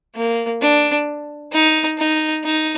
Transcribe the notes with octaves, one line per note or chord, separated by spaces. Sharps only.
A#3
D4
D#4
D#4
D#4